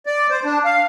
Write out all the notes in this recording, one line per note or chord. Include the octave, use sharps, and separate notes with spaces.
D5
C5
D4
F5